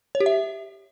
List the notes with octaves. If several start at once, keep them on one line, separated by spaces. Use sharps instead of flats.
C#5
G4
E5